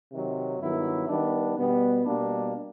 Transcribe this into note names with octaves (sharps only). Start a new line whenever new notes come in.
C3 D#3 F#3
G2 D#3 F#3 B3 E4
D#3 G3 B3 D4
B2 G3 B3
B2 G3 A#3 D4